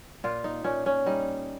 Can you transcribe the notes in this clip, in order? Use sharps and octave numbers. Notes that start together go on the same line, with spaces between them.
A#2 F4
D#4
A#2 C#4
C#4
G3 D#4